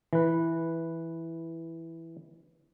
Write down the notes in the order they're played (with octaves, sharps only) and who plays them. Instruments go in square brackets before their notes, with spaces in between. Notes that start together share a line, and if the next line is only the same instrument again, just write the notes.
[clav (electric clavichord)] E3 B4